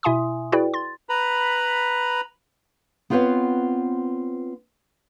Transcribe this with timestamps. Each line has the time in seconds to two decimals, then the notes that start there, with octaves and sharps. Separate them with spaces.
0.03 B2 E4 E5 G#5 C6 D#6
0.52 E4 F#4 G#4 B4 D5 G5
0.74 C6 A6
1.09 B4 A#5 B5
3.10 B3 C4 F4 B4 C#5 F#5